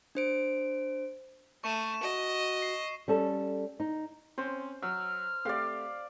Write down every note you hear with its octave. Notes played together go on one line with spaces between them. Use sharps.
D4 C5 D7
A3 C#6 D#7 E7
F#4 D#5
C7
G3 C#4 A4
D#4
C4 C#4 C5
F#3 E6 F6
A3 C4 G4 D5 F5